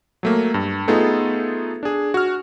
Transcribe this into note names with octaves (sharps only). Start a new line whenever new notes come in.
F#3 A3 A#3
G2
A3 B3 D#4 F4 G#4 A4
D4 G#4
F#4 F6